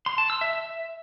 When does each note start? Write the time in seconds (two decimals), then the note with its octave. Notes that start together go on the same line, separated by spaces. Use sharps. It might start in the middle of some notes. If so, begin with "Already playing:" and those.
0.06 C6
0.18 A5
0.30 E6
0.41 E5
0.53 E5